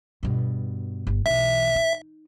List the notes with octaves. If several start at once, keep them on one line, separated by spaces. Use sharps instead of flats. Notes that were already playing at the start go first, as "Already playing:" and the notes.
G2 B2
G1
B1 E3 E5
D#4